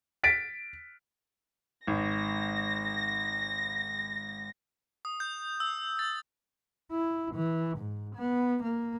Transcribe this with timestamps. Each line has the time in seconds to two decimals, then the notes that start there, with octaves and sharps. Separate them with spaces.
0.24 A6 B6 D7
1.87 G#1 A#6
5.05 D#6
5.20 G6
5.60 E6
5.99 A6
6.91 E4
7.35 E3
7.78 G#2
8.16 B3
8.63 A#3